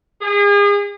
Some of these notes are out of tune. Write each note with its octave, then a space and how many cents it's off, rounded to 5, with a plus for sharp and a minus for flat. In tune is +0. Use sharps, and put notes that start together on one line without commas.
G#4 -35